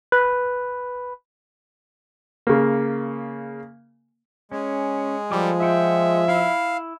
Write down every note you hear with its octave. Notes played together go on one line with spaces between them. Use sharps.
B4
C#3 A#3
G#3 C#4
F3 G3 A4 D6
F4 E5 F#5 G5
E4 F5